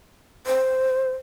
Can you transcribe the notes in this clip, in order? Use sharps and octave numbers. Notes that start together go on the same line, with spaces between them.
C5